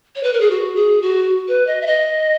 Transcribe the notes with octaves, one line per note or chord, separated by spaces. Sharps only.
C#5
B4
A#4
G#4
F#4
G#4
F#4
B4
D#5
E5
D#5